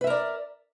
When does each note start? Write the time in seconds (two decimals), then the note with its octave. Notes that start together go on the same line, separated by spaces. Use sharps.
0.01 B4
0.04 E5
0.07 A#4
0.10 D5